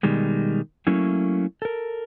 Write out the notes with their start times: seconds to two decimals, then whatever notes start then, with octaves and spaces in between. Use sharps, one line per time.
0.03 B2 D#3 G3 G#3
0.87 F#3 A3 A#3 C#4 E4
1.62 A4 A#4